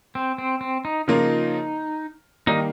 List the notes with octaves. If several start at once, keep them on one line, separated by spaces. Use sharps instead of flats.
C4
C4
C4
D#4
C#3 F3 A#3 D#4 F4 A#4
D#3 G3 A#3 D#4